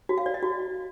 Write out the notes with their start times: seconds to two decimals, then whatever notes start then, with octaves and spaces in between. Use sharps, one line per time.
0.09 F#4
0.18 F5
0.26 D5
0.34 D#5
0.42 F#4